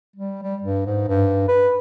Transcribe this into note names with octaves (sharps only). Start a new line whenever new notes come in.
G3
G3
G2
G#2
G2
B4